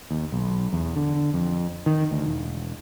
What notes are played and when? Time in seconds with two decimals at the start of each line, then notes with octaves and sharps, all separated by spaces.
0.11 D#2
0.32 B1
0.73 E2
0.96 D3
1.34 F2
1.86 D#3
2.11 D2
2.26 E1